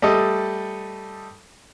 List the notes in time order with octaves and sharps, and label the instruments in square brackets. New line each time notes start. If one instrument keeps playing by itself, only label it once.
[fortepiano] G3 A3 A4 D#5